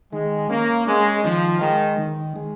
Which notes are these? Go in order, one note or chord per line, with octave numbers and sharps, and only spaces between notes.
D#3 G#3
A#3 C#4
G#3 C#4
D#3 F3
D#3 G#3
D#3
G#3